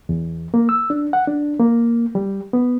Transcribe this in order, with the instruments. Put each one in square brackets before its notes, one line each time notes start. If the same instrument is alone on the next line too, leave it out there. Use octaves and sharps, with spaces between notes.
[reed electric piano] E2
A#3
E6
D4
F#5
D4
A#3
G3
B3